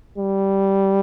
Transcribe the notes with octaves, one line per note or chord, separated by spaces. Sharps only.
G3